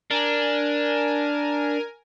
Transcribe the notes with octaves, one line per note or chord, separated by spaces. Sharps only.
D4 A#4 G#5